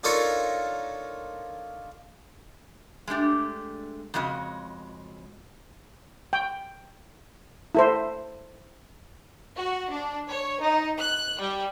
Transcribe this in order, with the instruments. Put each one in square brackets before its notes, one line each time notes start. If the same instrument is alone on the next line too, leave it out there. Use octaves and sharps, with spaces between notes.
[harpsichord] D4 D#4 F4 A4 A#4 C#5
[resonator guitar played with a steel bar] G#3 A3 D4 G4
F2 C#3 G#3 F#4 D#5
[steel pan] G5
E4 A4 C5
[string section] F#4
D4
C#5
D#4
F#6
G3